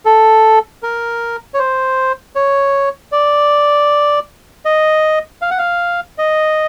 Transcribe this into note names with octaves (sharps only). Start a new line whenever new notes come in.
A4
A#4
C#5
C5
C#5
D5
D#5
F5
F#5
F5
D#5